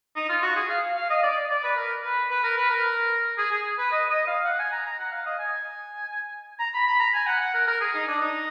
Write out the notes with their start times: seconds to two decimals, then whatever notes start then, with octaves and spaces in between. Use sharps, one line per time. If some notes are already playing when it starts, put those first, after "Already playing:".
0.16 D#4
0.29 F4
0.42 F#4
0.56 G#4
0.70 F5
0.97 F5
1.10 D#5
1.23 D5
1.50 D5
1.63 B4
1.77 A#4
2.04 B4
2.31 B4
2.44 A#4
2.57 B4
2.70 A#4
3.38 G#4
3.51 G#4
3.78 B4
3.91 D#5
4.10 D#5
4.27 F5
4.45 F#5
4.59 G#5
4.72 A#5
4.85 A#5
4.98 F#5
5.12 F5
5.26 D#5
5.39 G#5
6.59 A#5
6.74 B5
6.87 B5
7.00 A#5
7.14 G#5
7.27 F#5
7.41 F#5
7.54 A#4
7.67 A#4
7.81 G#4
7.94 D#4
8.08 D4
8.21 D#4